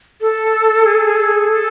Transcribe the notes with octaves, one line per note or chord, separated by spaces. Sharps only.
A4
G#4
A4
G#4
A4
G#4
A4